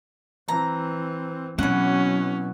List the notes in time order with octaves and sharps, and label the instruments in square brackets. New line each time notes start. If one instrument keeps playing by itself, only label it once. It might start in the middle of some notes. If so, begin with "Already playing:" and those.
[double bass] E3 C4 [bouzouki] A#5
[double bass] B2 F#3 [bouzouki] E3 F#5 [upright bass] C4 [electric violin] C#4